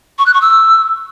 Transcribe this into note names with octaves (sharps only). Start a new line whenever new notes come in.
C#6
F#6
C#6
E6